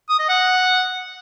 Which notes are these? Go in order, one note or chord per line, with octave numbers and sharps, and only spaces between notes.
D#6
D#5
F#5